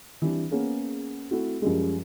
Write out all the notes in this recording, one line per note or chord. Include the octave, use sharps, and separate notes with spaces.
E3 G3 C4 D4
A#3 B3 C#4 G#4
A3 C4 E4 F#4
F#2 F3 G3 G#3